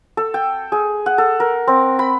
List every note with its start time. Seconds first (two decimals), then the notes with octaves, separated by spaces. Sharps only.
0.17 A4
0.34 G5
0.72 G#4
1.06 F#5
1.18 A4
1.40 A#4
1.68 C4
1.99 B5